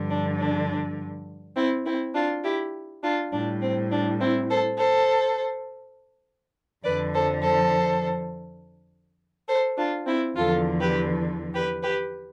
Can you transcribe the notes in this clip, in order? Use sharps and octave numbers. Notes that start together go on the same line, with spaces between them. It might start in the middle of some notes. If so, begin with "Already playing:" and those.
Already playing: G2 D3 F3
D4
D4
C4 E4
C4 E4
D4 F4
E4 G4
D4 F4
A2 G3 D4
C4
D4
C4 E4
A4 C5
A4 C5
F2 D3 F3 B4 D5
A4 C5
A4 C5
A4 C5
D4 F4
C4 E4
E2 D3 F3 F4 A4
G4 B4
G4 B4
G4 B4